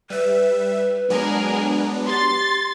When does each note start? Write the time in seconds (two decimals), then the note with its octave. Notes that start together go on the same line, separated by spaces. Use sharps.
0.10 G3 B4 E5
1.10 F#3 G#3 B3 D4 G#4 A#4
2.06 G4 C6 A6